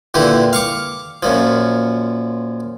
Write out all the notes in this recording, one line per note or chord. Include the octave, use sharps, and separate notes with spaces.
A#2 D3 E3 G4
F5 C#6 D6
F#2 A#2 F3